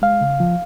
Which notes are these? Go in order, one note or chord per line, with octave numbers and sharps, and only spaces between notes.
G#3 F5
C#3
F3